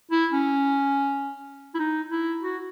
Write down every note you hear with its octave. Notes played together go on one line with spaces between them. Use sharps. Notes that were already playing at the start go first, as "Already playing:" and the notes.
E4
C#4
E4
D#4
E4
F#4